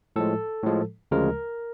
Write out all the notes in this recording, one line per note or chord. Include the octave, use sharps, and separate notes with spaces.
A2 F3 G#3 A4
A2 F3 G#3
D2 C#3 F3 G#3 A#4